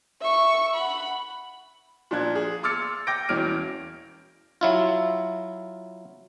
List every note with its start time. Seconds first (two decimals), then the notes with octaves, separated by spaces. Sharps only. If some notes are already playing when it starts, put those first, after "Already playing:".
0.20 E5 C#6
0.75 F#5 B5
2.11 A#2 F3 D4 F#6 G#6
2.35 G#4
2.63 C6 D6 E6 F6 A6 C#7
3.07 G5 D6 G6 A#6 D7
3.29 E1 E3 C#4 F6 D7
4.61 F#3 E4 F4